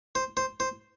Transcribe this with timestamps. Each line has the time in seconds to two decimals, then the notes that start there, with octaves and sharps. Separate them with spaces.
0.15 C5
0.37 C5
0.60 C5